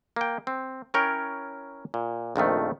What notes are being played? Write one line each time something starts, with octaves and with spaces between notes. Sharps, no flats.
A#3 G5
C4
C#4 E4 A#4 C#5 G5
A#2
A#1 F2 D#3 A3